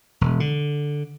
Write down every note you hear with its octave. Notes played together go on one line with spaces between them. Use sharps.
E1
D3